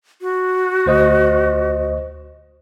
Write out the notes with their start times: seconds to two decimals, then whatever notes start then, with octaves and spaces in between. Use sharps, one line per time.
0.22 F#4
0.86 D2 C5 D#5